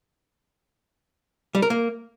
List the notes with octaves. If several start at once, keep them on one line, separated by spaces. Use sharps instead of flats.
G3
A#4
A#3